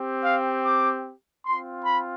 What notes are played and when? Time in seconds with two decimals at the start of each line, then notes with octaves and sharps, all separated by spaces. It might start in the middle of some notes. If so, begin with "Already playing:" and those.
Already playing: C4 G4
0.24 F5
0.64 D6
1.45 C4 F4 C6
1.85 B5